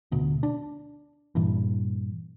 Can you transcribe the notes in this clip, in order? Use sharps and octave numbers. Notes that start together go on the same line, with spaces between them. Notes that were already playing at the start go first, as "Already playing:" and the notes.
D1 D2 B2
D4
G2 A#2 E3